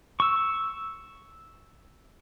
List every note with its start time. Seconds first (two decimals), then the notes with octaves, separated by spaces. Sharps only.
0.20 C#6 E6